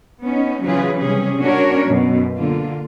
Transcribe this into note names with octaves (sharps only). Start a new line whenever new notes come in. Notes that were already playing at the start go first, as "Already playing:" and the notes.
B3 C#4 D#4
C#3 E3 F#3 F4 G#4 B4
C3 G3 C#4 G#4
C#4 D4 F#4 A#4 C#5
F#2 B2
D3 A#3 F4